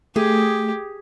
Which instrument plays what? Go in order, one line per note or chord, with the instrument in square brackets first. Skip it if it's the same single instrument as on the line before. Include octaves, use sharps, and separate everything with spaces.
[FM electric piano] A3 [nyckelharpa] G4 [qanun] G#4